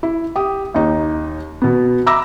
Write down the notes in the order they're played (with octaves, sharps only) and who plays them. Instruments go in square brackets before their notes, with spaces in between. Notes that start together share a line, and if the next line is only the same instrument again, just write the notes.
[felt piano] E4
G4 D#6
D#2 D#4
B2 B3
E5 A#5 B5 D6 E6 A#6